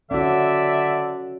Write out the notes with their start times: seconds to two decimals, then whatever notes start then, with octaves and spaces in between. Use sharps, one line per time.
0.11 D3 C#4 F#4 D5 E5